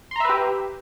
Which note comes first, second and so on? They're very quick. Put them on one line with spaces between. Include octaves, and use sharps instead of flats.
C6 A#5 E5 B4 G4